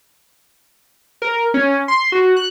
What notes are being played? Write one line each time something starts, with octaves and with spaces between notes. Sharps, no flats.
A#4
C#4
C6
F#4
F#6